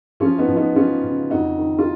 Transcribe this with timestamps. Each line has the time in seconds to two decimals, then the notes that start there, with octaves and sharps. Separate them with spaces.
0.20 F3 C#4 F4
0.38 B3 D#4
0.48 F3
0.57 B3 D#4
0.75 F3 C#4 F4
1.03 C#3
1.30 F2 D#4 F#4
1.58 D#3
1.79 F4